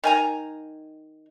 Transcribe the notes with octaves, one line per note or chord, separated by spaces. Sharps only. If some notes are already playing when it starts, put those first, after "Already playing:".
D#3 G#5 A#5